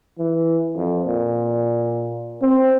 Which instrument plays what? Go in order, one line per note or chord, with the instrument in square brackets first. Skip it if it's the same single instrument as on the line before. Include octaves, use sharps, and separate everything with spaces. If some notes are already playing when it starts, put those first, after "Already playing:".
[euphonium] E3
F2
A#2
C4